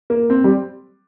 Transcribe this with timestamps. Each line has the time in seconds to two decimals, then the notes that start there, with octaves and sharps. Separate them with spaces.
0.10 A#3
0.30 C4
0.44 G3